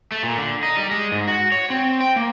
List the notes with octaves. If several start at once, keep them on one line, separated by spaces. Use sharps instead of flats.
A3
A#2
D3
D#4
G3
G#3
G#2
F#4
C#5
C4
G5
A#3